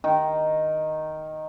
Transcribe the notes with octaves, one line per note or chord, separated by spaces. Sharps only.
D#3